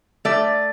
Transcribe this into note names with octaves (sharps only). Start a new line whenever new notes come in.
A3 D5